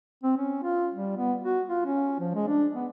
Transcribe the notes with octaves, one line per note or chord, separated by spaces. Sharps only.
C4
C#4
F4
G3
B3
F#4
F4
C#4
F3
G#3
D4
B3